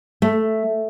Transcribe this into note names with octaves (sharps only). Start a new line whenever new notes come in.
A3